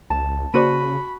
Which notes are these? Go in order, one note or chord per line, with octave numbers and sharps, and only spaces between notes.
C#2 A5
C#3 A#3 F#4 C5 D5 B5 D#7